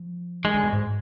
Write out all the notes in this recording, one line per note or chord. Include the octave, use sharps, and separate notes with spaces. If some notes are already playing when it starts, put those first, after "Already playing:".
Already playing: F3
D#3 G#3
D3
B2
G#2